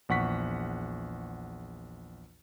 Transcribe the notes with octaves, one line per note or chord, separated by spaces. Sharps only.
A#1 E2 F#5 C#6 B6